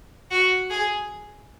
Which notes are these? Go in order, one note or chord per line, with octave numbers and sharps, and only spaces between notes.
F#4
G#4